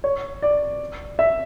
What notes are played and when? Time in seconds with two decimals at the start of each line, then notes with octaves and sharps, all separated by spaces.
0.04 C#5
0.42 D5
1.19 E5